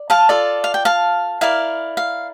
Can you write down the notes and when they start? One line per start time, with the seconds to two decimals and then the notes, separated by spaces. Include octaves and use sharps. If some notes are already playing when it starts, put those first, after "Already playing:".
Already playing: D5
0.10 F5 A5
0.29 F4 A4 D5
0.64 F5
0.74 G5
0.85 F5 A5
1.41 E4 A#4 D5 F5
1.97 F5